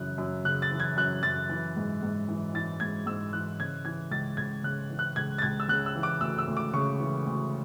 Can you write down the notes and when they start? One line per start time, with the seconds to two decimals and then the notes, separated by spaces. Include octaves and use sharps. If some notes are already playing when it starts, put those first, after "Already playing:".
Already playing: F#2 C#3 E3 F#6
0.18 F#2
0.45 C#3 F#6
0.62 A6
0.71 E3
0.80 G#6
0.97 F#2 F#6
1.23 F#2 A6
1.49 E3
1.76 G#2
2.03 G#2
2.28 E3
2.54 E3 A6
2.80 G#2 G#6
3.06 G#2 E6
3.33 E3 F#6
3.59 C#3 G#6
3.85 E3 G#6
4.11 C#2 A6
4.37 C#2 G#6
4.63 C#3 F#6
4.90 E3
4.99 F#6
5.16 C#2 G#6
5.38 A6
5.42 C#2 G#6
5.60 E6
5.68 C#3 F#6
5.86 E6
5.96 E3
6.03 D6
6.21 D2 E6
6.39 E6
6.48 D2
6.57 D6
6.74 C#3 C#6
7.00 E3
7.26 D2